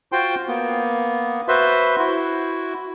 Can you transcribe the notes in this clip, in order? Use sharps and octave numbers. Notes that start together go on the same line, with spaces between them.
F4 F#4 C5 G5 C6
A#3 B3
F#4 B4 C5 E5 C6
E4 F#4